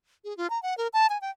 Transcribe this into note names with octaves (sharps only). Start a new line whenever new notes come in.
G#4
F4
A#5
F#5
A#4
A5
G#5
G5